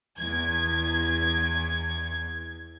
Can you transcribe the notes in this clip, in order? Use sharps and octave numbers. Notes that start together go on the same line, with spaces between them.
E2 G#6